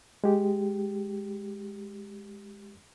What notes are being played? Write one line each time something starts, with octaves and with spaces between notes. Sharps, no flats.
G#3 G4